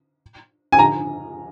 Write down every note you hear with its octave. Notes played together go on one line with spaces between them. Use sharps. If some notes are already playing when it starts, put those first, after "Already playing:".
G#5
A#5